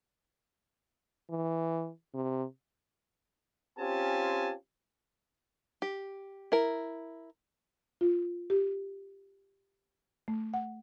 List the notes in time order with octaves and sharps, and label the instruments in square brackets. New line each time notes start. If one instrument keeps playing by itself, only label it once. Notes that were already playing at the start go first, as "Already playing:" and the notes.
[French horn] E3
C3
[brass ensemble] C4 C#4 F4 G4 G#5 A5
[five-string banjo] G4
E4 A#4
[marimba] F4
G4
A3
F#5